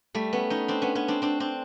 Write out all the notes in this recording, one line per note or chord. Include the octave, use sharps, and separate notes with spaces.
G3 A3
B3 C#4
C#4 D#4
C4 D4
B3 C#4
B3 C#4
C4 D4
C4 D4
C4 D4